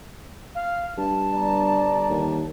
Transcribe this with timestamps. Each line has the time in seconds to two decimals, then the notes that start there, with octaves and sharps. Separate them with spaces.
0.55 F5
0.98 G2 A5
1.33 G1 D5 A#5
2.10 D#2